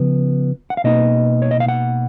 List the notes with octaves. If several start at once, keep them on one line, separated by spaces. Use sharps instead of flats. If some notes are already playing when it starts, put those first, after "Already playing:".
Already playing: C#3 F3 B3
F#5
F5
B2 A#3 D#4 D#5
C#5
D#5
F5
F#5